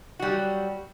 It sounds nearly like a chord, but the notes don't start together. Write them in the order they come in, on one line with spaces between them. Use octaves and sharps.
F#4 G3 F#3